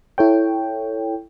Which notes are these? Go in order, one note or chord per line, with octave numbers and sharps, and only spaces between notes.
E4 A4 C#5 G5